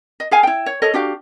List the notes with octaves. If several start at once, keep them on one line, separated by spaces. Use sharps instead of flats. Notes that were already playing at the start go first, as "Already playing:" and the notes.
D#5
G#4 F5 G#5
E4 G5
C#5
A4 C#5 D#5
D4 F#4 G4 F5